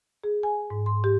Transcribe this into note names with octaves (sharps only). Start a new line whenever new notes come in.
G#4
G#5
G#2
C6
G4